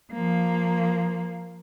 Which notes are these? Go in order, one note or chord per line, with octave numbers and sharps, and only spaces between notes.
F3 A#3